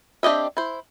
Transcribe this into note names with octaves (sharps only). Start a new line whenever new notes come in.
C4 D4 G4 D#5 E5
E4 C5